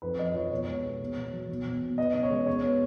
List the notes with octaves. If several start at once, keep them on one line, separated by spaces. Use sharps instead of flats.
F2 B4
F3 D#5
F3 C#5
B2 C#5
G#3
B3
B2
B2
F#3
B2
B2
B2
B3 D#5
C#3
C#5
G#3
B2 C#5
B3